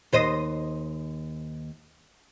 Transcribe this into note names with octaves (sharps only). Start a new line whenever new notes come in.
D#2 C5 D#5